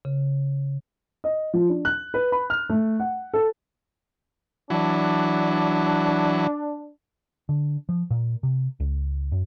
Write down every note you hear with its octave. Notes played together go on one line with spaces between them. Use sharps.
C#3
D#5
F3
D4
F#6
B4
B5
F6
A3
F#5
A4
E3 F#3 D4
D3
F3
A#2
C3
C#2
F#2